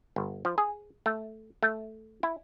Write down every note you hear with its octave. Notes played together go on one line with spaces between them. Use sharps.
G1
F3
G#4
A3
A3
E4